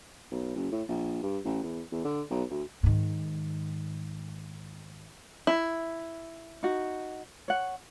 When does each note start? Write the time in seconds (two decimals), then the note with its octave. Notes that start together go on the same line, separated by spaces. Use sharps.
0.32 B1
0.56 F#1
0.72 A2
0.88 A#1
1.23 G2
1.44 A1
1.63 E2
1.92 E2
2.05 D3
2.30 B1
2.50 D2
2.83 G#2 D#3
5.47 E4
6.63 D#4 F#4
7.48 C#5 F#5